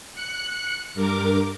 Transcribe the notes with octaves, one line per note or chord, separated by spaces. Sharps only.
F#6 C#7
G2 A#4 D6